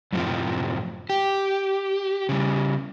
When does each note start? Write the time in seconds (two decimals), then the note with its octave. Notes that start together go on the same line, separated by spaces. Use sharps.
0.13 F#2 A2 C3 F3
1.10 G4
2.29 C#3 G3